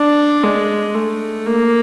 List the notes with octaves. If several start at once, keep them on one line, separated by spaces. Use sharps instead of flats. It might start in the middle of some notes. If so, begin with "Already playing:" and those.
Already playing: D4
G#3
A3
A#3